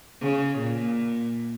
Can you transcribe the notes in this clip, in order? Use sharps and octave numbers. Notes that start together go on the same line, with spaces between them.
C#3
A#2